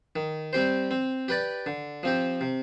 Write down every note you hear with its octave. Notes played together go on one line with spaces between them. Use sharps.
D#3
G3 C4 G4 C5
C4
G4 B4 D5
D3
F3 C4 G4
C3